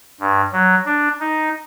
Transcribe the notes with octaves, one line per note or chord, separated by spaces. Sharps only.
G2
F#3
D4
D#4